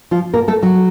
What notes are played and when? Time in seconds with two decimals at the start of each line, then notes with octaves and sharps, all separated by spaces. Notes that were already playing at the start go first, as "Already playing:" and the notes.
0.11 F3 F4
0.34 B2 A#3 A#4
0.48 A3 A4
0.63 F#3 F#4